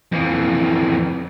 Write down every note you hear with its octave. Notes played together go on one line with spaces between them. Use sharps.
F2 E3